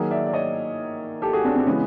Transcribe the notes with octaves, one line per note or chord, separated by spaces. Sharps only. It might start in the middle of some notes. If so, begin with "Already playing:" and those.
Already playing: D#3 F#3 A#3 G#4 A#4
D5 E5
D5
C#5 D#5
G4 A4
F#4 G#4
C4 D4
C4
C#3 E3 G#3 B3 C#4